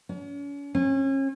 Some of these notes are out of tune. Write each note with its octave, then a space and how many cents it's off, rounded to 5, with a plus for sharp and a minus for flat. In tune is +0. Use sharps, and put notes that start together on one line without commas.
C#4 +40
C#4 -35